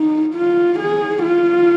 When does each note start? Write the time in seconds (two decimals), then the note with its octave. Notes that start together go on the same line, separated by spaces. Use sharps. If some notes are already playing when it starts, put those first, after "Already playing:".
Already playing: D#4
0.35 F4
0.79 G#4
1.22 F4